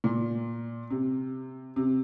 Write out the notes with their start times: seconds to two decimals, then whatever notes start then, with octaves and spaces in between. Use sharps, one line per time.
0.04 A#2
0.91 C3
1.76 C3